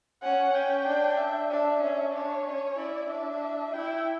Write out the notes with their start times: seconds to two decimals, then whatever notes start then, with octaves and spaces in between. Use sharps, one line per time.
0.22 C#4 F#5
0.54 C#4 G5
0.86 D4
1.18 E5
1.50 D4 E5
1.82 C#4
2.14 D4 C#5
2.45 C#4
2.78 E4 D5
3.09 D4 E5
3.73 E4 G5